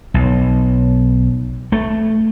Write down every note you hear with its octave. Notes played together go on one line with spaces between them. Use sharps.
B1
A3